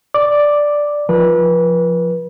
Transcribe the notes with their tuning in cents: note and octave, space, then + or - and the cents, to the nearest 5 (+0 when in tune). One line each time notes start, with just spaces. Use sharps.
D5 +0 D6 +0
F3 +0 B4 -30